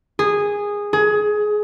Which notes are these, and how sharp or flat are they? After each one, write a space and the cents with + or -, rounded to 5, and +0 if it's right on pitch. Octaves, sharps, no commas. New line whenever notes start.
G#4 -15
G#4 +20